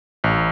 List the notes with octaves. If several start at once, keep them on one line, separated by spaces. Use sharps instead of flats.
A1